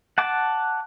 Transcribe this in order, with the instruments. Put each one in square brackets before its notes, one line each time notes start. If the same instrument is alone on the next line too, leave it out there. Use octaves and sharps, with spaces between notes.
[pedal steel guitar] F#5 A5 D6